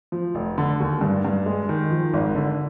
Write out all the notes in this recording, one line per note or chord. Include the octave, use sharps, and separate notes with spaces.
F3
F1
D3
D#2
G2
G2
G#3
D#3
F3
G#1
D3